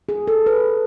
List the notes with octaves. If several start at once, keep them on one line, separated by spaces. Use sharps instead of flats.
G#4
A4
B4